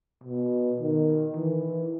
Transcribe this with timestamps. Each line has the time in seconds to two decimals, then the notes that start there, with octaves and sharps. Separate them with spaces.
0.24 B2
0.80 D#3
1.36 E3